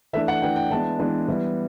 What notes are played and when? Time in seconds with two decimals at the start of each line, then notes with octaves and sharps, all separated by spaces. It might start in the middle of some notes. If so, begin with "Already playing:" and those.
0.13 E3 A3 D4 E5
0.28 F#5
0.42 E3 A3 D4 G5
0.56 G5
0.70 E3 G#3 B3 D4 A5
0.99 E3 G#3 B3 D4
1.28 E3 G3 B3